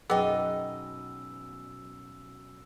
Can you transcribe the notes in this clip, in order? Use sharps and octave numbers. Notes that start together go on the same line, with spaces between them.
F#2 B2 B3 D#4 G#4 D#5 G5 E6